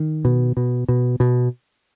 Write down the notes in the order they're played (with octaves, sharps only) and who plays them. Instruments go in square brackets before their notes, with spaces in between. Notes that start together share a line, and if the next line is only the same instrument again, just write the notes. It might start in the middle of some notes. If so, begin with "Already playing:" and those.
Already playing: [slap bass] D#3
B2
B2
B2
B2